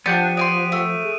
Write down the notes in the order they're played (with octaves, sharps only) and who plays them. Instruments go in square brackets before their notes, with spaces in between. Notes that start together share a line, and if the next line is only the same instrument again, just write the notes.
[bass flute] F3 [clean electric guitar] B3 G4 F#5 [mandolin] D4 [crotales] D#7
[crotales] F#6
[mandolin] D5 G#5 C6 [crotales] D#6 D7 D#7
[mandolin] A3
[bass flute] G#4